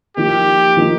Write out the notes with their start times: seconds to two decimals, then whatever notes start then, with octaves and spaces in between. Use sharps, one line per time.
0.17 F3 A#3 D#4 G4
0.77 F3 A#3 D#4